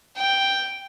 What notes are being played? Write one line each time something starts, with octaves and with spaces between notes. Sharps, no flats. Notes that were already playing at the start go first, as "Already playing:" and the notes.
G5